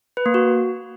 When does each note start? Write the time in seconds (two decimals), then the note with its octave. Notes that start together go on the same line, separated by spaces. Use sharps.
0.17 B4
0.26 A#3
0.34 F#4